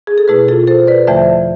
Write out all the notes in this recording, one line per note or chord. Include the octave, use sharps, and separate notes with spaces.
G#4
A4
B2 A3 E4 G#4 B4
F4 A4
A4 C5
B4 D5
E2 D3 F3 A3 C5 E5